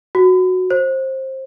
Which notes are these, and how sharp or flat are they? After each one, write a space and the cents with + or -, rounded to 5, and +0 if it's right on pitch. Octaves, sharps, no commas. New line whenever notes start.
F#4 -5
C5 +20